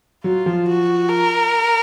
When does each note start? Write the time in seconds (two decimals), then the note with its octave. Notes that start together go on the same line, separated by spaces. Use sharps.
0.24 F#3 F4
0.46 F3
0.67 F#4
1.09 A#4